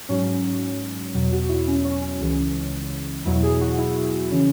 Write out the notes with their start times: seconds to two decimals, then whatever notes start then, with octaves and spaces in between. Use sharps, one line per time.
0.09 G#2 F#3 C#4
1.15 E2 B2 F#3
1.32 F#4
1.49 E4
1.67 C#4
1.85 C#4
2.02 C#4
2.21 C#2 C#3 E3
3.25 E2 B2 F#3 E4
3.43 G#4
3.61 F#4
3.78 E4
4.31 C#3 E3 C#4